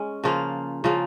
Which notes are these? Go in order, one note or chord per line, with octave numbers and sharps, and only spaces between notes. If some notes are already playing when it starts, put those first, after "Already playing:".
Already playing: G#3 C#4
C#3 F3 A#3 F4
C#3 F3 A#3 F4